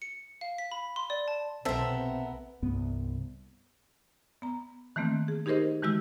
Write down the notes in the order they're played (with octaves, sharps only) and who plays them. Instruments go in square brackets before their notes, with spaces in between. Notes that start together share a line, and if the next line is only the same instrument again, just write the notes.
[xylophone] C#7
F5
B6
B5
C6
D5
A5
[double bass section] B1 C3 [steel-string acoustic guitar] B3 A#4 [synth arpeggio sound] C4 [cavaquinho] A4 E5
[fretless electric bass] C2 G2 B3
[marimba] B3 A#5
D#3 E3 A3 A#3 C4
G#4
D#4 G4 G#4 A#4 C5 D#5
D#3 E3 G#3 F#4 E6